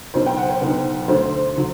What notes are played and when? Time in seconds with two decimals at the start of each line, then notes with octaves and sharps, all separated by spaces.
0.14 B1 B2 F#3 B3 D4 C5
0.26 G5
0.37 F#5
0.50 C5
0.61 B1 B2 F#3 B3 D4
1.08 D2 D3 F#3 A3 C5
1.57 D3 F#3